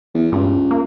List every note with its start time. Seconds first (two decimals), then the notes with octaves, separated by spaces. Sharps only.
0.14 E2
0.32 C#2 G2
0.71 A#3